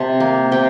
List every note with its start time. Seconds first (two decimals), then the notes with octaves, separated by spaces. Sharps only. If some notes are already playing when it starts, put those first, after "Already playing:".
Already playing: C3 C5 A5
0.20 A#3
0.52 C3 G5